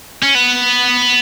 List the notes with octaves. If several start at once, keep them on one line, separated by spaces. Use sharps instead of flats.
C#4
B3